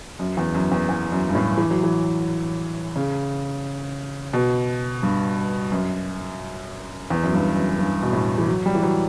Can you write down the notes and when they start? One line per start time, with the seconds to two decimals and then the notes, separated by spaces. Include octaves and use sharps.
0.19 F#2
0.37 E2
0.54 F#2
0.72 E2
0.89 E2
1.12 F#2
1.28 G2
1.35 A2
1.58 E3
1.70 F#3
1.83 E3
2.96 C#3
4.33 B2
5.03 G2
5.72 F#2
7.10 E2
7.23 F#2
7.33 G2
7.56 F#2
7.79 G2
8.02 B2
8.13 A2
8.38 E3
8.48 F#3
8.66 G3
8.75 E3
8.83 F#3